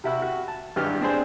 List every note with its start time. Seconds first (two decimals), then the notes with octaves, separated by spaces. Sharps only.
0.04 C3 E4 F#4
0.22 F#4
0.48 A5
0.76 G#1 G2 E3 G4 F6
1.01 C4 D4 G#4 C5